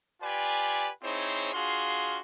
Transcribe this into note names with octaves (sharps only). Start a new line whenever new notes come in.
F4 G4 B4 D5 G#5
C4 D#4 E4 G#4 C5 C#5
D4 F4 F#4 G#4 F5 C6